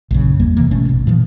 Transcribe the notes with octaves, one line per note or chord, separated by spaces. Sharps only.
A#1 F#2 C#3
G#1 E2 G3 A#3
C3 E3 A#3
G#1 B2 A3 C#4
A1 B2
A#2 E3 F3